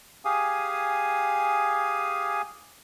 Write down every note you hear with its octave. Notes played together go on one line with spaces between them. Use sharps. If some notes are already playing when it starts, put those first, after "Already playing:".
G4 G#4 F5 G#5 D#6